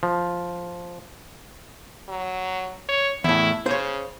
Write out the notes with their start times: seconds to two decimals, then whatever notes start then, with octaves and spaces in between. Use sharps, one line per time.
0.03 F3
2.09 F#3
2.89 C#5
3.24 E2 A2 E4
3.66 C#3 C5 C#5